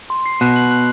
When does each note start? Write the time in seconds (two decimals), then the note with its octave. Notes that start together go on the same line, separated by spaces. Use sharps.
0.10 C6
0.26 C7
0.41 B2 F#6
0.56 F#7
0.71 F#6